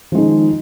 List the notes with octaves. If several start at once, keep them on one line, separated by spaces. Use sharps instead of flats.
D#3 F3 G#3